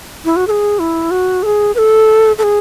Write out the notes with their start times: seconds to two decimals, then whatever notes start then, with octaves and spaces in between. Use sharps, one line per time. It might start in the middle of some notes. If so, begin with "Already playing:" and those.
0.25 E4
0.36 F#4
0.47 A4
0.51 G#4
0.79 E4
1.11 F#4
1.43 A4
1.46 G#4
1.75 B4
1.78 A4
2.38 A4
2.43 G#4